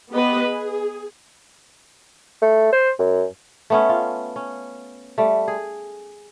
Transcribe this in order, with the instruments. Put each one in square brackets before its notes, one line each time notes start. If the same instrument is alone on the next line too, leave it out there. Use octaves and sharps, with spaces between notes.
[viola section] B3 G4 B4 D#5
G#4
[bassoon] A3
C5
F#2
[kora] A3 B3 C#4
F4
C#4
G3 A3
G#4